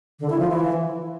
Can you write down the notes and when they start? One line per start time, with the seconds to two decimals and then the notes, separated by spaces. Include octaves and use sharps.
0.20 D3
0.30 E4
0.40 F3
0.50 E3